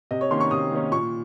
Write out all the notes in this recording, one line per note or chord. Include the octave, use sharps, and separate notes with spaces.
C3 D#5
C#5
D#3 A#3 C#4 C6
C#6
C3 D#6
D#3 A#3 C#4
A#2 C#6